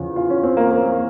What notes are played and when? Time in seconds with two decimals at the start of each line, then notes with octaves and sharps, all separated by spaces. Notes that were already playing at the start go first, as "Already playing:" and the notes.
Already playing: E2 C#3 F3
0.16 F4
0.30 C#4
0.43 C4
0.57 A#3
0.71 A#3